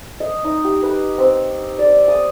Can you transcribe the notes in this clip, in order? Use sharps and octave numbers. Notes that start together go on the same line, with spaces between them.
D#5
D#4
G4
B4
C4
D5
D#6